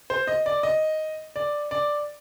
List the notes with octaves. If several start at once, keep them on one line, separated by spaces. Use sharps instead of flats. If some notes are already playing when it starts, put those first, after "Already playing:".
C5
D#5
D5
D#5
D5
D5